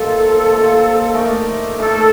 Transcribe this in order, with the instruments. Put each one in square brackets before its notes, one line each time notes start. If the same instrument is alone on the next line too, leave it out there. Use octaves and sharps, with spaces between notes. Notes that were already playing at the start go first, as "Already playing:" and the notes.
Already playing: [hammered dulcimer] C3 D#3 A#3 F4 [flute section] A4
[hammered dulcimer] C3 D#3 A#3 F4
A3 D#4 A#4 D5
[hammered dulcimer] A3 D#4 A#4 D5 [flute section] A4